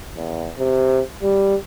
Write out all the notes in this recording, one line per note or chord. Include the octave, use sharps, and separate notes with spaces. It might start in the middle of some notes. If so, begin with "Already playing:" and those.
E2
C3
G3